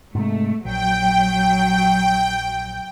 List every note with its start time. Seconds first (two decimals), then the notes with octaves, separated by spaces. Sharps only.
0.15 G#2 C3 G#3 A3
0.65 A#1 F#3 G5